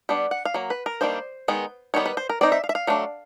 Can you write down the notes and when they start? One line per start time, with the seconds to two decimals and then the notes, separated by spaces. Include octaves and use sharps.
0.09 G3 B3 D4 F#5
0.31 F#5
0.45 F5
0.54 F#3 A#3
0.70 B4
0.86 A#4
1.01 D#3 G3 A#3 D4 C5
1.48 D#3 G#3 B3
1.94 D#3 G3 B3 C#5
2.06 B4
2.17 C5
2.29 A#4
2.41 G3 C4 D#4 D5
2.52 E5
2.64 F5
2.69 E5
2.75 F5
2.87 F#3 A3 D4